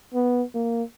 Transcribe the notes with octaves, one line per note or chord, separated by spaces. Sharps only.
B3
A#3